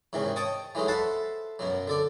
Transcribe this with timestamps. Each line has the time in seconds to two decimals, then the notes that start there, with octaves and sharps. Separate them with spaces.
0.13 E2 G#2 C3 D#3 C#4
0.36 C#5 D#5 G5 A5 C#6 D#6
0.75 E3 F#3 G#3 A3 D#4
0.88 A4 C5 E5 F#5 A5 B5
1.59 F#2 B2 F#3
1.88 D3 A4 D5